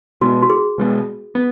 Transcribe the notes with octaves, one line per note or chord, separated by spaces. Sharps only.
B2 G#3 B3 F#4
F#4
G#4
B2 G#3 B3
B3